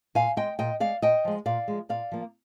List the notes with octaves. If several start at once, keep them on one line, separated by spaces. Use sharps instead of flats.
A#2 F5 G#5
G#3 D#5 G5
A#2 D#5 G5
G#3 D5 F5
A#2 D#5 G5
F3 G#3
A#2 D5 F5
F3 G#3
A#2 D5 F5
F3 A#3